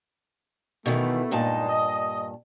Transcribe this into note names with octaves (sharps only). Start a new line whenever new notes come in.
B2 D#3 E3 A3
G2 A#2 G#3 D#4 D#5 A5
D#5